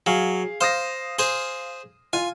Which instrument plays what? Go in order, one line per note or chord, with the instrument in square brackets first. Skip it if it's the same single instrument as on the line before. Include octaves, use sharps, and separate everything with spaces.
[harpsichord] F#3 [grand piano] G#4 F5
[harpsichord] C5 [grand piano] F5 D#6 A#6
[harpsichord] G#4 C5
[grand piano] F4 [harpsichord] G#5